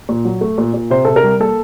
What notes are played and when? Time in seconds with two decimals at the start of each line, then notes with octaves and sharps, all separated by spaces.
0.09 A#2
0.25 F#3
0.41 A3
0.58 A#2
0.74 A#2
0.90 C3 C5
1.05 C3 A4
1.16 A#4
1.23 G3
1.40 A#3 A4